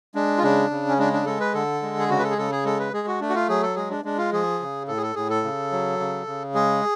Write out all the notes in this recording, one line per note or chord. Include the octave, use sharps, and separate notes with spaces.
G#3 D4
F4
C#3 D4
C#3
C#4
G#3 D4
D4
G#3 A4
B4
D3 A4
G#3
G#4
C#3 F#4
B4
A4
G#4
C#3 A4
G#4
G#3 A4
B4
G#3 G#4
F#4
A3 D4
F#4
F4
F#3 G#4
A4
G#3 G#4
D4
G#3 D4
F4
F3 G#4
C#3
A2 A4
G#4
A4
A2 G#4
A4
C#3
F#3
C#3
C#3
G#3 G#4